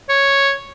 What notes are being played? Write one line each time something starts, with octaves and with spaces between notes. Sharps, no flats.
C#5